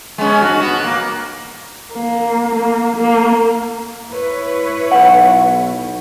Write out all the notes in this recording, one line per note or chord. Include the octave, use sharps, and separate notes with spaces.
G#3 B3 C#4
G2 F#4
B3 F#4
A#2 A#3
A#3
A#3
A#3
E4 B4 C#5
B1 F#5